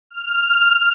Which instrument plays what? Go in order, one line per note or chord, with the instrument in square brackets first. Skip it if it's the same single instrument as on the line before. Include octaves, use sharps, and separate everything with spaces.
[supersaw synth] F6